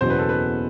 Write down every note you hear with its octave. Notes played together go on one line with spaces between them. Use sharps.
F#1 E2 B2 F#3 C5
B4
A4
B4